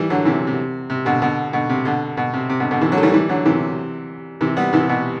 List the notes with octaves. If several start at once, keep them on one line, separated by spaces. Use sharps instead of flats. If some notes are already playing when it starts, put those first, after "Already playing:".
Already playing: E3 G3
D3 F#3
C3 E3
C3
C3
B2 D3
B2 D3
B2 D3
C3
B2 D3
B2
C3
C3
B2 D3
B2 D3
C3 E3
D3 F#3
A3
E3 G3
E3 G3
D3 F#3
C3 E3
C3 E3
G3 B3
C3 E3
B2